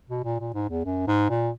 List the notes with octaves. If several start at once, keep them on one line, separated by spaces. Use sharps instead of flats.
B2
A#2
A#2
G#2
E2
F#2
G#2
A#2